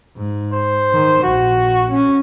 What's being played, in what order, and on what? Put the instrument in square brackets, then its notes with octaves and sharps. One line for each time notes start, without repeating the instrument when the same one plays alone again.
[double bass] G#2
[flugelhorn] C5
[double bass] D#3
[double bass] A#1 [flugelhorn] F#4
[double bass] C#4